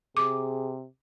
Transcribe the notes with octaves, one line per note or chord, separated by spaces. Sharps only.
C3 G#4 D6